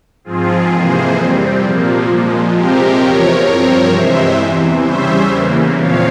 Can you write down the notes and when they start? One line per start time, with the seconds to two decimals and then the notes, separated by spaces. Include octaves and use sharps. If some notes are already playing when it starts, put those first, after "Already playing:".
0.24 G#2 F3 C4 F4 G#4
0.70 F2 C3 E3 A#3 G#4 C5
1.15 C3 G3 C4
1.61 A#2 F3 A#3
2.07 A#2 F3 G#3
2.52 C3 F3 G#3 C4 G4 A#4
2.98 E2 C3 F3 A#4 C#5
3.44 G2 F3 C4 A#4 C#5
3.89 C3 E3 G#3 C5 E5
4.36 E2 C3 E3
4.81 C#3 G3 C#4 C5 E5
5.28 E2 C#3 E3 A#3
5.73 A#2 F3 C4 C#5 F5